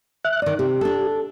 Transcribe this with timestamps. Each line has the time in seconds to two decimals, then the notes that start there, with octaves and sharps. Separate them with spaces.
0.25 E5 F#6
0.42 D#3 D#4 D5
0.59 C3 G4
0.81 D4 A4